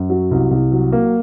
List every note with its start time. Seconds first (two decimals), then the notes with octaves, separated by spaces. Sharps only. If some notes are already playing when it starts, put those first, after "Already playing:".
Already playing: F#2
0.10 F#3
0.31 C2
0.51 C2
0.72 F#3
0.92 A#3